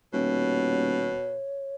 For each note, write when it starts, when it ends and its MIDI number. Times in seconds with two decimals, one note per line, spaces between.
0.13 1.16 27
0.13 1.39 47
0.13 1.76 73